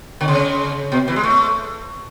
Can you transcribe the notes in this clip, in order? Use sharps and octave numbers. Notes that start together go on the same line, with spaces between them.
D3
C#3
B2
E3
G#3
A3